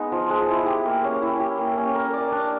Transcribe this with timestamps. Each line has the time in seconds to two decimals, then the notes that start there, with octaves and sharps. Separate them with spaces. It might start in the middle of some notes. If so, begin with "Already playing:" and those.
Already playing: G#3 B3 D#4
0.12 F3
0.30 G#3
0.49 E4
0.66 G4
0.86 A#3
1.04 C#4
1.22 E4
1.40 G4
1.58 A#3
1.78 C#4
1.95 A#4
2.14 D5
2.32 D4